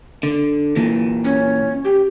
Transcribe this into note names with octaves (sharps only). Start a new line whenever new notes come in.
D3
A#2 E3
C#4
G4